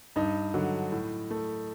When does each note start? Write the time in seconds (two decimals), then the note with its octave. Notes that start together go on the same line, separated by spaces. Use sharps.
0.16 G2 D#4
0.54 D3 F#3
0.92 A2
1.30 A3